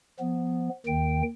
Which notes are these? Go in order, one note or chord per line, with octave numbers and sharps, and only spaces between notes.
F3 B3
D#2 D#3 G5